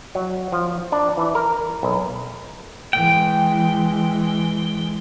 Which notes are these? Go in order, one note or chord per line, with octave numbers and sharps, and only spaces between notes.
F#3
F3
D4
E3
A#4
B1
E3 G#3 G5